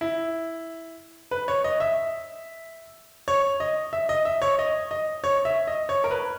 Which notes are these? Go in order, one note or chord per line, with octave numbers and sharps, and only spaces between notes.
E4
B4
C#5
D#5
E5
C#5
D#5
E5
D#5
E5
C#5
D#5
D#5
C#5
E5
D#5
C#5
A#4
B4